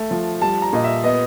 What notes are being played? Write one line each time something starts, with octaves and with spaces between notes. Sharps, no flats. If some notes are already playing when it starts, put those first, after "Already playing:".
Already playing: A3
F3
G3 A5
A#5
A#2 D#5
E5
B3 D#5